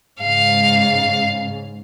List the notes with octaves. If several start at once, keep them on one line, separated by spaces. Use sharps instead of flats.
G#2 C#3 F5